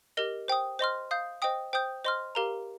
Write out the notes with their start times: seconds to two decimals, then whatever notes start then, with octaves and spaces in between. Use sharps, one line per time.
0.17 G4 A#4 D#5
0.48 C5 G5 D#6
0.79 C5 D#5 C6 F6
1.11 F5 D#6 G6
1.42 C5 D#5 G5 D#6
1.73 C5 G5 D#6 G6
2.05 C5 D#5 C6 F6
2.35 G4 A#4 F5 A#5